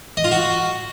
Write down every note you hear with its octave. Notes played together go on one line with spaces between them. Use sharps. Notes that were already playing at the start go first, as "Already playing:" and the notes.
D#5
F4
F#4